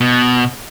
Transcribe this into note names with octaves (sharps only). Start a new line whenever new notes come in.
B2